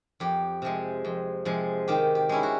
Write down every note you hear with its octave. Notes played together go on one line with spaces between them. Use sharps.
F2 G4
C3 F3 G#3
F2
C3 F3 G#3
D#3 G4
G4
G#3 C#4 E4
F#4